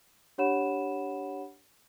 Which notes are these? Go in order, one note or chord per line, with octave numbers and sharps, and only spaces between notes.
D4 G4 C#5 F#5 B5 E7